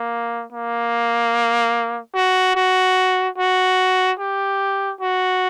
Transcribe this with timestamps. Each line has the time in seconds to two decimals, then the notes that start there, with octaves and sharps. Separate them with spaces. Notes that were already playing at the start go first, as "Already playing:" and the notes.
Already playing: A#3
0.52 A#3
2.15 F#4
2.55 F#4
3.38 F#4
4.19 G4
5.01 F#4